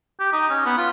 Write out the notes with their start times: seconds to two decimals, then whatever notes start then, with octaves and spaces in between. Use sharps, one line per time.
0.20 G4
0.33 D#4
0.50 C#4
0.66 B3
0.78 F4